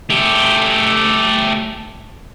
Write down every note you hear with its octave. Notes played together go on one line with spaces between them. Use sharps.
A3 G4